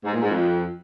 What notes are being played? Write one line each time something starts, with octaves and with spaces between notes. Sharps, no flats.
G#2
A#2
G#2
F2